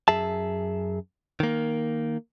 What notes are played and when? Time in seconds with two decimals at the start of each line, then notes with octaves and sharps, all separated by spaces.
0.08 F#2 G#4 E5 A5
1.40 D#3 A#3